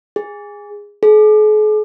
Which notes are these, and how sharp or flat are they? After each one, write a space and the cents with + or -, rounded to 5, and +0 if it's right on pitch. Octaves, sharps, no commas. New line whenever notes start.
G#4 -15
G#4 +45